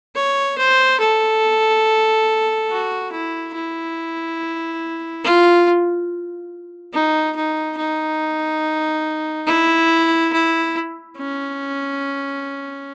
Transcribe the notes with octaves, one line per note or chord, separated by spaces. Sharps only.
C#5
C5
A4
F#4
E4
E4
F4
D#4
D#4
D#4
E4
E4
C#4